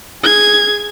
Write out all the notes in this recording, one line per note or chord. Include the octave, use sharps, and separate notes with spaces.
G#4 G#6